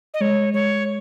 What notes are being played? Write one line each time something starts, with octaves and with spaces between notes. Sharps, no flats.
D#5
G#3 C#5
G#3 C#5